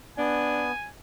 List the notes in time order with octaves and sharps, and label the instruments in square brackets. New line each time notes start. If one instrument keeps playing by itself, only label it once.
[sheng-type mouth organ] B3 [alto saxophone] D4 [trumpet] G#5